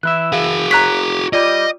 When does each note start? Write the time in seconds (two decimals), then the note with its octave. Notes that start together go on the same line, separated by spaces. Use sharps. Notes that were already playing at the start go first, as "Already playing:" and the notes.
0.03 E3 E4 E5 F#6
0.32 F#4 G#4 F5
0.71 C#5 A#5 F#6 B6
1.33 G3 F4 G4 D5 D#5 D#7